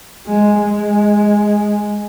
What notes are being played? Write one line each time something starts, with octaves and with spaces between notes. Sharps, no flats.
G#3
G#3